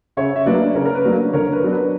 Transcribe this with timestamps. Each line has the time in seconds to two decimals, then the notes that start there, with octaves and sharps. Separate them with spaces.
0.17 C#3 C#5 E5
0.36 E5
0.46 F#3 A#3 D4 B4 D5
0.75 C#3 A#4 C#5
0.85 A#4
0.95 B4
1.05 F#3 A#3 D4
1.33 D3 A#4 C#5
1.53 B4
1.63 F#3 B3 D4
1.72 B4